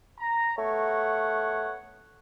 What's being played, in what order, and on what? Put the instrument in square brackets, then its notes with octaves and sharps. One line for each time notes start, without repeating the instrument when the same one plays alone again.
[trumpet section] A#5
[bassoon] A3 [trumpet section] B3 C#5 F#5